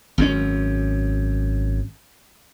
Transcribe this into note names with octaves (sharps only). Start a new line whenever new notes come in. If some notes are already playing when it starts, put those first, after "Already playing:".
G#1 F#2 B2 C#4